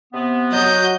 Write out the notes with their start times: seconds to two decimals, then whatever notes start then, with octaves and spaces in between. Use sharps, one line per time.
0.13 C3 B3
0.52 F#3 F#4 D#5 G6